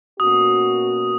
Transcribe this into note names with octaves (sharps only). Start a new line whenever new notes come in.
B2 A#3 C#4 F#4 D#6